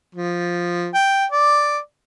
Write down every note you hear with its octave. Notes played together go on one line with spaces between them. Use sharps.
F3
G5
D5